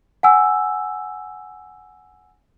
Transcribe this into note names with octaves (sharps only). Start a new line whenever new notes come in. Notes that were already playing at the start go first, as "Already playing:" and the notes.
F#5 G#5 E6